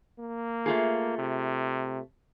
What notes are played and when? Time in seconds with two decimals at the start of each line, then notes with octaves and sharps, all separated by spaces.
0.19 A#3
0.66 A3 F4 G#4
1.18 C3